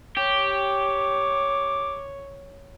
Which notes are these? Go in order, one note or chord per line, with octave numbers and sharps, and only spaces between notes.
G4 C#5 D6